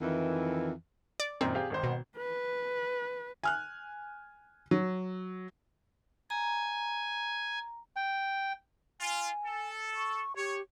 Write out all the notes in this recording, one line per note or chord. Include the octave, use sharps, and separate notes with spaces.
F2 D#3 E3
D5
F#2 A#2 D#3 C4
G4 G#4 F5
G#1 D#3 C5
B2
B4
G#5 F6 F#6
F#3
G#5 A#5
G5
F4 G#5
A4
C#6
G4 C#5